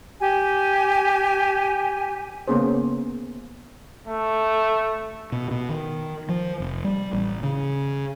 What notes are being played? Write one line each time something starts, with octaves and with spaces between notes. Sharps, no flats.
G4 G#5
C#3 A#3 B3 C#4 G#4 C5
A3
B2
B2
D#3
F3
F1
G3
A1
C#3